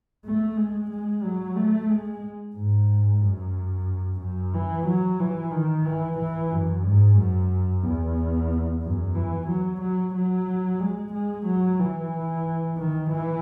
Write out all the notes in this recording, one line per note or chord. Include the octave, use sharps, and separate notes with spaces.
A3
G#3
G#3
F#3
A3
G#3
G#2
F#2
F#2
E3
F#3
E3
D#3
E3
E3
F#2
G#2
F#2
E2
F#2
E3
F#3
F#3
F#3
G#3
G#3
F#3
E3
D#3
E3